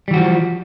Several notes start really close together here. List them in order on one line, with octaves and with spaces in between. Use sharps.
G3 E3 F#4 F3